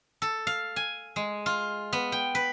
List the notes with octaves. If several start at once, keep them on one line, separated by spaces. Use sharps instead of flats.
A4
F5
G#5
G#3
F4
B3
G5
B4